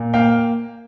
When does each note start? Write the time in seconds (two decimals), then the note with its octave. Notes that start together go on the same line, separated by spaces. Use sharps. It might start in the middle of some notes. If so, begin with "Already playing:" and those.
Already playing: A#2
0.14 A#3 F5 G5